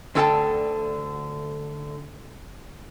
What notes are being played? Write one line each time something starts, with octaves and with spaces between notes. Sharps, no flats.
D2 D3 A4 F5 G5 A5